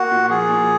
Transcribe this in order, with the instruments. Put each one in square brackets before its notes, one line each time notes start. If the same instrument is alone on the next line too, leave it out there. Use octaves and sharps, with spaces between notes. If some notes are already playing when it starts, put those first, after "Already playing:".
Already playing: [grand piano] A#3 [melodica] F#4
[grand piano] A#2
[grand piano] F3 [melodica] G#4
[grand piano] A#2